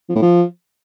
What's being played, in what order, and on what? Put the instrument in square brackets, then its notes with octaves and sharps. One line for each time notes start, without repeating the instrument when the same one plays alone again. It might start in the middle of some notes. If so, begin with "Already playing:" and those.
[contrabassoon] F3
A2
F3